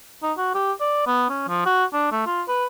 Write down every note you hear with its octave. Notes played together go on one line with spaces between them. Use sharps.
D#4
F#4
G4
D5
B3
C#4
F3
F#4
D4
A3
F4
B4